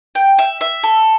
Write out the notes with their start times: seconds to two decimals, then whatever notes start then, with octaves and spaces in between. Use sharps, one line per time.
0.15 G5
0.38 E5
0.61 E5
0.83 A4